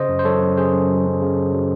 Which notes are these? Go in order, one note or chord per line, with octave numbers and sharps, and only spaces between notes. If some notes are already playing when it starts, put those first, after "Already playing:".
Already playing: C#3 C5 D#5
F#2
C5
F#3 A4 C#5
F#2
C#3 G#4 C5
F#2
F#3
F#2
C#3
F#2
F#3